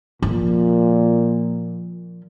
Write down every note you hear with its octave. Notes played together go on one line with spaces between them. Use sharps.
A#2 F3